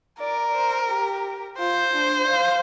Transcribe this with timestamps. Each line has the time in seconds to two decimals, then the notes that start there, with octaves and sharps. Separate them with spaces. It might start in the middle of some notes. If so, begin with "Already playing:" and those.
0.20 A#4 D5
0.55 C5
0.89 G4
1.59 F4 C5
1.94 D4
2.28 F5